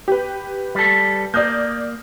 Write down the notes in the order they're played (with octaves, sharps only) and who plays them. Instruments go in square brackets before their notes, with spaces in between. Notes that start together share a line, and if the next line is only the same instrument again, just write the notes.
[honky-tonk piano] G4 B4
[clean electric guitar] G3 A4
[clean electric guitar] A#3 [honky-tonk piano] D5 D#6 G6